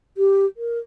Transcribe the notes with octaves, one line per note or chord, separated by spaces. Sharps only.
G4
A#4